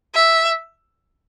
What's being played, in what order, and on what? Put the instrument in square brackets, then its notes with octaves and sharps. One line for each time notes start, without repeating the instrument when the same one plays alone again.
[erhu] E5